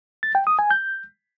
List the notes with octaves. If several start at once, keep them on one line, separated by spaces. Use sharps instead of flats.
A6
G5
D#6
G#5
G6